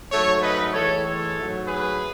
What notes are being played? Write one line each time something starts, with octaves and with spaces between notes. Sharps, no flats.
G#2 F#3 A3 A4 C#5
B4 D#5
A2 E3 G#3 A4 C#5
A4 C#5
G#2 F#3 A3
G#4 B4